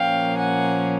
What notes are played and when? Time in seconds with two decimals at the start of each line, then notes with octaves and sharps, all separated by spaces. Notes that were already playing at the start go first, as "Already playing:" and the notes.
Already playing: A#2 F3 A#3 C#4 F5 G5
0.36 F#5 G#5